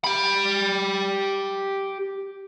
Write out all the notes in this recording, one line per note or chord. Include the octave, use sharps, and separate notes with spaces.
G4 B5